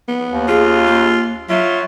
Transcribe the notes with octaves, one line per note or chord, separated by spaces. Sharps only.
B3
D#2
F4 G#4
A#3
F#3 F4 E5